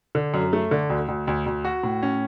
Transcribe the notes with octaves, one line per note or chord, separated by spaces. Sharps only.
D3
F#2
A3
D3
D2
D2
D2
D2
F#4
A2
C#4